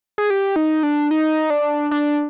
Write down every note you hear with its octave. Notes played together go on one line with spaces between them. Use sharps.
G#4
G4
D#4
D4
D#4
D4
D4